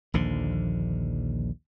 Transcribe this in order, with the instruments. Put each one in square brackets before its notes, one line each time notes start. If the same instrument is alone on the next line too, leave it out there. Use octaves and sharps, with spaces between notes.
[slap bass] A#1 D#2 D3 F3